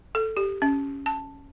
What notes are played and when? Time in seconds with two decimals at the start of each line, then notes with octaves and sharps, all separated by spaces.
0.15 A4
0.37 G4
0.62 C#4
1.06 A5